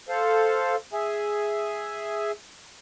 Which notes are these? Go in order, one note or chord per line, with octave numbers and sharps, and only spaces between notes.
A4 C5 F5
G#4 E5 G#5